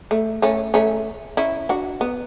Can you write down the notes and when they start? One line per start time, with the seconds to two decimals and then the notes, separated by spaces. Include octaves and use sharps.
0.11 A3
0.42 A3 C#4
0.74 A3 C#4
1.37 C#4 E4
1.69 D4 F#4
2.01 B3